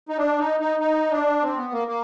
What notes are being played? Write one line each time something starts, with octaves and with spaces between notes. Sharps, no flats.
D#4
D4
D#4
D#4
D#4
D4
C4
B3
A#3
A#3